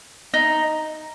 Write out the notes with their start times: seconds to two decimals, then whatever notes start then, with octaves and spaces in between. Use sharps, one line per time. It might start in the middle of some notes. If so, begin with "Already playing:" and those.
0.34 D#4